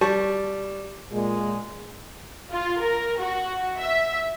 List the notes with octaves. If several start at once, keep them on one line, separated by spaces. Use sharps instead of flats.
G3 A5 C#6
A#2 G#3
F4
A#4
F#4
E5